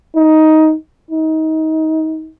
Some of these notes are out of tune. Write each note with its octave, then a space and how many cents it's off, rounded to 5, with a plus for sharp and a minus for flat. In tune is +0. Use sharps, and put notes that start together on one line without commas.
D#4 +10
D#4 +25